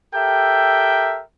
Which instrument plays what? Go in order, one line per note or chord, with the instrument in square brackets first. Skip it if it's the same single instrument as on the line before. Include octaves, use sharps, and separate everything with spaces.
[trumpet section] G4 A4 A#4 E5 G5